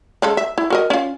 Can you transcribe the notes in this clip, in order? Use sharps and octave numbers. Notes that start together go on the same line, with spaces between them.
C#3 G#3 A4
E5
E4
F#4 A#4 D#5
C#4 F4